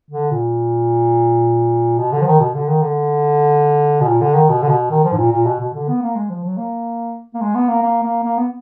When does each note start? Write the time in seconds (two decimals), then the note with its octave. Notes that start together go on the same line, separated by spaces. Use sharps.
0.10 D3
0.31 A#2
1.99 B2
2.12 D3
2.21 F3
2.26 D#3
2.40 B2
2.54 D3
2.68 D#3
2.82 D3
4.01 B2
4.07 A#2
4.21 D3
4.34 D#3
4.49 B2
4.62 D3
4.69 B2
4.90 D#3
5.04 F3
5.12 G#2
5.18 A#2
5.32 A#2
5.46 B2
5.60 B2
5.74 D3
5.88 B3
6.02 A#3
6.16 G#3
6.30 F3
6.44 F#3
6.57 A#3
7.34 A#3
7.41 G#3
7.55 B3
7.68 A#3
7.82 A#3
8.03 A#3
8.24 A#3
8.38 B3